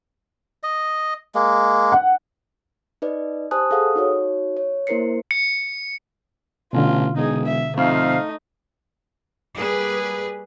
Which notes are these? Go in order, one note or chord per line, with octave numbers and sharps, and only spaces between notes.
D#5
G#3 A#3
F#5
D#4 B4 D5 D#5
G4 C5 G#5 A5 D#6 F#6
G#4 A4 F5 F#5 D#6
D#4 F#4 C#5
C#5
A#3 E4 A#4 C5 C7 C#7
C#7
A1 B2 D3 F4
E1 D#4 G#4
E5
F2 A3 D#4 C5 E5 F5
G3 A#3 G#4 B4